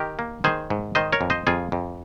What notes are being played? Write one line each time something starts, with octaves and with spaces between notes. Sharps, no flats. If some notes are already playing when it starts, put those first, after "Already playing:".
Already playing: D#3 G4 A#4
A#3
D#3 G#4 C5
G#2
D#3 C5 D#5
A#4 C#5
F2
C5 D#5
F2 F4 G#4
F2